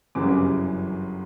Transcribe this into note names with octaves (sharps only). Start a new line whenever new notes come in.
G1 F#2 C#3 E3 G3 D6